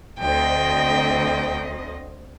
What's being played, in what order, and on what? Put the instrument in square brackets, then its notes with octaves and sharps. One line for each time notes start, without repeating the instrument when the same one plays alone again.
[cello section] D2 C4 D#5 [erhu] G5